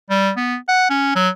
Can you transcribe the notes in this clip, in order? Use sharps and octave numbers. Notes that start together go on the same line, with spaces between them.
G3
B3
F#5
C#4
F#3